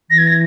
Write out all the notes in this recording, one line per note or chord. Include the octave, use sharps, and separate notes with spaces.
E3 A#6
G#6
A#6